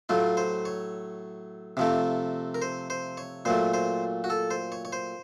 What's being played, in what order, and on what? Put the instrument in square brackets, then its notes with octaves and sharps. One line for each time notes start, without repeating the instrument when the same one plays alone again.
[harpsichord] A2 F#3 A3 F4
C5
C#5
C3 F3 A3
A#4
C5
C5
C#5
A#2 F#3 A3 C5
C5
F#4
A4
C5
C#5
C#5
C5